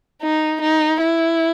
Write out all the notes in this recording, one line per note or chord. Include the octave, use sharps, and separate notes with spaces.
D#4
D#4
E4